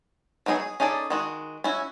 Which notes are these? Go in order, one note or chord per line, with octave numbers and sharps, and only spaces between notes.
F#3 B3 D#4 E4 G#4
G#4
C#4 D#4 G#4 A4 D5
D#3 G#3 F#4
C#4 E4 F#4